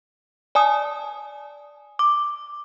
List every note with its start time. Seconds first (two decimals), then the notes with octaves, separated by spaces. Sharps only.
0.55 D5 G#5 A5 D#6
1.99 D6